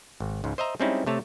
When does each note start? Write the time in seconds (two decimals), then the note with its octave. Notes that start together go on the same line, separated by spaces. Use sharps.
0.20 G#1
0.44 C#2 G#2
0.58 C5 D#5 E5 A#5
0.80 G3 G#3 C4 C#4 D#4 E4
1.06 C3 A3 C#5 A5